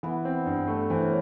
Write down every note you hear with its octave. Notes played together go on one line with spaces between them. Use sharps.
E3 B3
C4
G2
A3
E3 C4
C#4